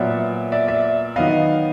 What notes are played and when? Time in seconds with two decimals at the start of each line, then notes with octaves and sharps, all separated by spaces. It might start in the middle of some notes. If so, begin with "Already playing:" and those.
Already playing: A#2 F#3 B3 D5 E5
0.52 D5 E5
0.68 D5 E5
1.16 D#3 F#3 B3 D#5 F5